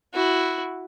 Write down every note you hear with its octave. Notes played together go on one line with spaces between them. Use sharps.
E4 F#4